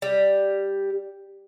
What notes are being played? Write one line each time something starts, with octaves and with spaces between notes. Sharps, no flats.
G3